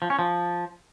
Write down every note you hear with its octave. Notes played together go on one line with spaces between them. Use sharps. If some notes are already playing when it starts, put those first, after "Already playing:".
F3
C#4
F3